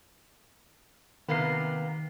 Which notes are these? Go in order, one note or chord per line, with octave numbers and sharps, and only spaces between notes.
C3 D#3 A#3 B3 C7